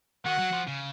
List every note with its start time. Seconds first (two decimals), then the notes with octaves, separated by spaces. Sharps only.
0.25 D#3 F#4 F#5
0.39 F#3
0.53 F3
0.68 C#3